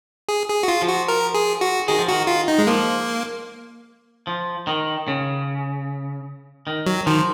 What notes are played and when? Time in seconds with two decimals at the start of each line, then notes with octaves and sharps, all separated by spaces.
0.29 G#4
0.49 G#4
0.63 F#4
0.68 F4
0.82 F3
0.87 F#4
1.08 A#4
1.34 G#4
1.61 F#4
1.88 D#3 G#4
1.99 F3
2.08 D#3 F#4
2.27 F4
2.48 D#4
2.58 G#3
2.67 F3 A#3
4.27 F3
4.67 D#3
5.08 C#3
6.67 D#3
6.86 F#3
7.06 D#3 F3